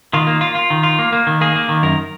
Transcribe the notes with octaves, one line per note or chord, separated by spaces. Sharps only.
D#3 F4
A#3
F4
F4
D#3
F4
A#3
A#3
D#3
A#3 G#4
A#3
D#3
F#2 A#4